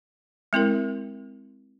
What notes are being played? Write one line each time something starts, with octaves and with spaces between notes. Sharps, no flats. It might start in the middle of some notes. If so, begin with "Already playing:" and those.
G#3 C4 E4 A#4